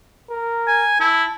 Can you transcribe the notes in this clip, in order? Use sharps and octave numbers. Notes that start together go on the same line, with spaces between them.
A#4
G#5
E4 A5